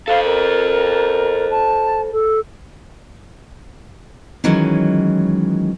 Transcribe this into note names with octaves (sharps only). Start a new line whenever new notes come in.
A4 C5 F5
A#4
A5
A4
D#3 E3 F#3 G#3 C#4